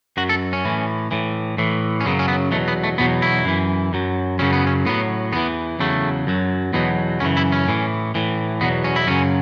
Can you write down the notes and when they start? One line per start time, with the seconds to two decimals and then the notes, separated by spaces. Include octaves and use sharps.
0.17 F#2 F#3 F#4
0.29 A4
0.53 C#4
0.65 A2 E3
1.11 A2 E3
1.58 A2 E3
2.01 C#4
2.05 F#2 C#3 F#3 B3
2.19 C#4
2.28 B3
2.52 E2 B2 F#3 A3
2.68 B3
2.84 A3
2.98 E2 B2 F#3 B3
3.22 E4
3.45 F#2 E3
3.93 F#2 F#3
4.39 F#2 C#3 F#3 C#4
4.53 B3
4.67 C#4
4.86 A2 F#3 B3
5.32 E2 E3 B3
5.79 E2 C#3 F#3 A3
6.27 F#2 F#3
6.73 E2 B2 F#3 B3
7.20 F#2 C#3 E3 C#4
7.37 E4
7.52 C#4
7.68 A2 E3
8.15 A2 E3
8.61 E2 B2 F#3 B3
8.84 C#4
8.96 E4
9.08 F#2 C#3 F#3 C#4